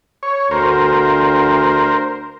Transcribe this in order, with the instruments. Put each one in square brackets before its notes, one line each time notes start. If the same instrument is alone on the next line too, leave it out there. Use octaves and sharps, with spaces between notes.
[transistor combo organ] C#5
[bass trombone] D2 [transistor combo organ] A#4 C5